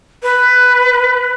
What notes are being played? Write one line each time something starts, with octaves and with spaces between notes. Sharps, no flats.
B4